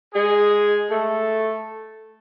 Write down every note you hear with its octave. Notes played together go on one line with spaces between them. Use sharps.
G#3 G#4
A3 A4